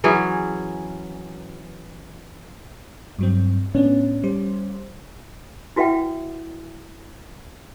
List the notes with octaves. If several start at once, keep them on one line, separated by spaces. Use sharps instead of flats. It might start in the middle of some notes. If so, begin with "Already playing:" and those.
E3 F#3 C#4 G#4
G2 F#3 C4
A2 B3 C#4 D4
G3 C5
E4 F#4 B4 E5 F#5 G5